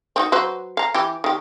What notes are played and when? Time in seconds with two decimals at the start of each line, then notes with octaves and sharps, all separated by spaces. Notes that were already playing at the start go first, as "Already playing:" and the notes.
0.16 C4 D#4 F#4
0.32 F#3 B4 C5
0.77 F5 A#5
0.94 E3 G4
1.24 D#3 G4